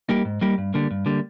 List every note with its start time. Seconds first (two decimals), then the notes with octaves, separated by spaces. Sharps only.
0.09 G3 A#3 D#4 G4
0.25 G#2
0.41 G3 A#3 D#4 G4
0.58 G2
0.74 D3 G3 A#3
0.91 G2
1.06 D3 G3 A#3